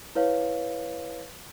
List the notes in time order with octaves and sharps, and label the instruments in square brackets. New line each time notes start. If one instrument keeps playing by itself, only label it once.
[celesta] E4 B4 C#5 F5